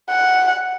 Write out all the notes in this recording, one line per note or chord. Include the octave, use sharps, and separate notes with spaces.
F#5